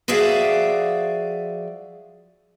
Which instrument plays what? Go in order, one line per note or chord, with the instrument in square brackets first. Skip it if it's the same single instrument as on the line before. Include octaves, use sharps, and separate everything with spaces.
[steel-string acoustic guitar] F3 F#4 G#4 D5 E5 F5